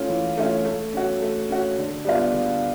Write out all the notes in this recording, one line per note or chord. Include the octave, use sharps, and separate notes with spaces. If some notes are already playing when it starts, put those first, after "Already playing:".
Already playing: A3 C#4 F4
E3
A3 C#4 F4
A3
C#4 F#4
A3
C#4 F#4
D3
G3 B3 D4 F4
D3